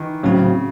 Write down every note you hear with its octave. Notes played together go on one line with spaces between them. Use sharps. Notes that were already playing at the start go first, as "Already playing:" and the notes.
Already playing: D#3 E3
A2 C#3 F#3 C4 F#4
C#3